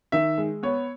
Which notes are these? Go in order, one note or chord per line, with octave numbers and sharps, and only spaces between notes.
D#3 E5
G#3
B3 C#5